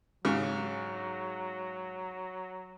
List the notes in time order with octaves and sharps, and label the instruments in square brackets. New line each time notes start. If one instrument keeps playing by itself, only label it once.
[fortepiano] G#2 C#3 [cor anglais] F#3